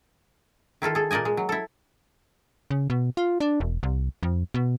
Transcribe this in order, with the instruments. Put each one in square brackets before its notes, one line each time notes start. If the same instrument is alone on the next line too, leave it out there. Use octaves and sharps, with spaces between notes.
[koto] D#3 E4 F4 A4
G#4 A4
A#2 A#3 D5 D#5 G#5
G#3
F#3
E4 A4
[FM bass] C#3
B2
F4
D4
E1
C2
F2
B2